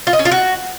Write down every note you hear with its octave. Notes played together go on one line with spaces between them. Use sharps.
F4
D#5
C#4
F4
F#4